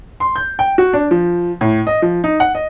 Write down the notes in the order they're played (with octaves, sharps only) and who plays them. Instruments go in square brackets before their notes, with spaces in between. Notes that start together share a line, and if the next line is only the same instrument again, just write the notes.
[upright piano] C6
G6
G5
F#4
D4
F3
A2
D#5
F3
D#4
F#5
D#5